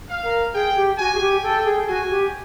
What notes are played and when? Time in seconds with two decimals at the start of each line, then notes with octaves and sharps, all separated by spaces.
0.08 F5
0.23 A#4
0.53 G#4 G5
0.75 G4
0.98 F#4 G#5
1.14 G#4
1.20 G4
1.42 A4 G5
1.64 G#4
1.87 F#4 G#5
2.10 G4